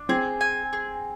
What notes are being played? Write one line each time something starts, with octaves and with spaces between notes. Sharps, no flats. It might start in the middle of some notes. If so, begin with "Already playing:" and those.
Already playing: D4
C4 G#4
G#5
G#4